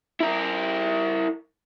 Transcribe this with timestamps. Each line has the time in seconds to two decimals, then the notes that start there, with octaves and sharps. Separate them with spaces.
0.20 E4 A#4